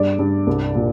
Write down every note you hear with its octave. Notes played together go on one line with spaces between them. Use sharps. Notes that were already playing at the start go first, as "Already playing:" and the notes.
Already playing: G2 D5
G2
C2
A#2